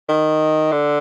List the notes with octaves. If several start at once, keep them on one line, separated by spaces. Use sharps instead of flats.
D#3
D3